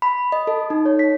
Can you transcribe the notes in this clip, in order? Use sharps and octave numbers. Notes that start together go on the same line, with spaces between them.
B5
D#5
A4
D#4
C#5
B6